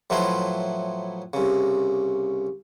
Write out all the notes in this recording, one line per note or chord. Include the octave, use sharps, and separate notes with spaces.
A2 F3 F#3 E4 B4 C6
C2 C#3